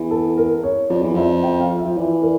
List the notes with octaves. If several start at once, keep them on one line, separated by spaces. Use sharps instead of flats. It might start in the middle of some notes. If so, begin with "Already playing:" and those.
Already playing: E2
A4
A#4
C#5
F2 D5
E2
F2 E5
G5
F5
E5
F3
E3 D5
A#4